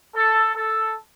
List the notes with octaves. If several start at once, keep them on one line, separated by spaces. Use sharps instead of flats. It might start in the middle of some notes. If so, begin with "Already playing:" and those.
A4
A4